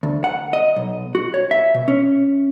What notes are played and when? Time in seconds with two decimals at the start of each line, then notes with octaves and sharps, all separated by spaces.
0.03 D2
0.24 F#5
0.53 D#5
0.76 B1
1.15 F#4
1.34 C#5
1.51 E5
1.74 B2
1.88 C#4